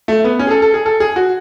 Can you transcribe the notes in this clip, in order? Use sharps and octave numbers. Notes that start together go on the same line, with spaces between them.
A3
B3
C#4
G#4
A4
A4
G#4
A4
G#4
F#4